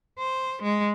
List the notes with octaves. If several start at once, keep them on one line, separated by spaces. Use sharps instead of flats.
C5
G#3